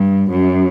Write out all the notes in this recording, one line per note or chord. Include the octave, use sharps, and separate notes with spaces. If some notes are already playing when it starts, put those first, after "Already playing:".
Already playing: G2
F#2